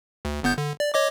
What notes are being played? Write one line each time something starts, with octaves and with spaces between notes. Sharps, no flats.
D2
G1 B3 G6
D3
D5
C#5 D#5 D6